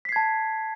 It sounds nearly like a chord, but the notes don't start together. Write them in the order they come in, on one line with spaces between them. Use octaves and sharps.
B6 C7 G#6 A5